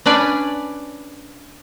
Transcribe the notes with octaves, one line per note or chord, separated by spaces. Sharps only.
C#4 D4 B4 D5 G#5